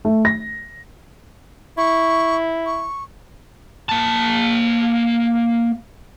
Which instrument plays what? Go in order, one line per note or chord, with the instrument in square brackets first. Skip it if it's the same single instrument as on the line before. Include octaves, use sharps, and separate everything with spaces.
[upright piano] A3
A#6
[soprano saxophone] E4 [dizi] C#6
[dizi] C#6
[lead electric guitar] A#3 A5